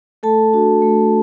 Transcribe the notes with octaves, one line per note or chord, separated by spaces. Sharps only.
A3 A4 A5
D4 F#4
A3